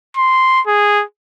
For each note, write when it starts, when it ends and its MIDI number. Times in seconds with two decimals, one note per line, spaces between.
0.17 0.61 84
0.67 1.04 68